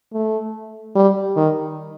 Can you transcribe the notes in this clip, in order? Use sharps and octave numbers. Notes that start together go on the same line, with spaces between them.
A3
G3
D#3